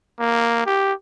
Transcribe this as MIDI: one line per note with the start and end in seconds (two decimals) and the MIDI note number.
0.20 0.66 58
0.66 0.93 67